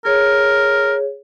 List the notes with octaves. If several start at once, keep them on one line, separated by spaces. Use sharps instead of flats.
G#4 A#4 C#5